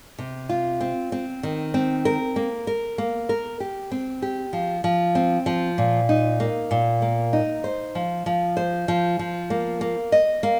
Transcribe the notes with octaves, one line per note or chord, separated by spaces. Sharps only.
C3
F4
C4
C4
D#3
C4
A#4
A#3
A#4
A#3
A#4
G4
C4
G4
F3
F3
C4
F3
A#2
D#4
A#3
A#2
A#3
D#4
C5
F3
F3
C5
F3
F3
A#3
A#3
D#5
A#3